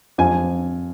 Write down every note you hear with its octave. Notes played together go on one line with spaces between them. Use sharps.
F2 G#5